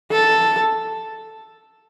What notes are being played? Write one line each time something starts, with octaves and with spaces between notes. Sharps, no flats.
A4